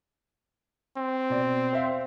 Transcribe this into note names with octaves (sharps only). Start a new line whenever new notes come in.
C4
B2 D5
C5 E5 F5